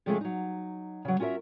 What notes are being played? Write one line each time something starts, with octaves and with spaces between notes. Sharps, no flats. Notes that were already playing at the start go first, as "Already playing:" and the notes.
C3 F3 G#3 A3 C#4 G#4
F#3 D#4
C#3 F#3
C#4 F4 F#4 A#4 E5